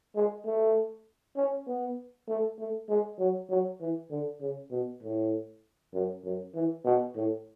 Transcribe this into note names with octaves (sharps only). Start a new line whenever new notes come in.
G#3
A3
C#4
B3
A3
A3
G#3
F#3
F#3
E3
D3
C#3
B2
A2
F#2
F#2
E3
B2
A2